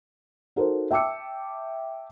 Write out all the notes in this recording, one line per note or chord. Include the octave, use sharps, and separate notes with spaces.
D#4 F#4 A4 A#4 C5
E5 G5 A5 D6 E6 C#7